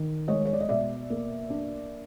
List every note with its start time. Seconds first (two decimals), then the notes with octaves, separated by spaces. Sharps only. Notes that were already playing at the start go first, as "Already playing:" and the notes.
Already playing: D#3
0.28 G#3 C#5 D#5
0.45 C#5
0.53 D5
0.61 D#5
0.69 B2 D5 E5
1.10 A#3
1.50 D4